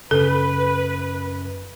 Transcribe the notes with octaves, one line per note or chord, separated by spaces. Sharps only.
F#2 C#3 A4 B4